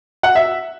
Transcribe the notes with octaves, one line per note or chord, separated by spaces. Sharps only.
F#5
E5